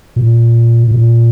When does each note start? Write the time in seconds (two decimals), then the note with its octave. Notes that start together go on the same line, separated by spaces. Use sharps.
0.16 A#2
0.91 A#2